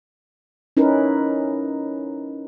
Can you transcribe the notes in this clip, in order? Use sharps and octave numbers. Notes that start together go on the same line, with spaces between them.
C#4 D#4 E4 A#4 B4